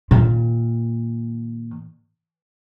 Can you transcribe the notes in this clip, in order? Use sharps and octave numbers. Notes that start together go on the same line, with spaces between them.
A#2 D#3